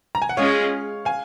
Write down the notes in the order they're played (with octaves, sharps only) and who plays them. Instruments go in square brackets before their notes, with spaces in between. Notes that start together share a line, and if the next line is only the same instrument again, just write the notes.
[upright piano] A#5
G#5
F#5
[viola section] G#3 C#4 F4 G#4 [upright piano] C#5 F5
[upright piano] F5 G#5